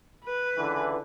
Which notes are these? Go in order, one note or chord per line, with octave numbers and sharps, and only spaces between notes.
B4
C#2 D3 E3